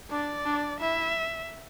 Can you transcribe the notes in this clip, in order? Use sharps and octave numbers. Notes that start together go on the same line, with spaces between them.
D4 D5
D4
E4 E5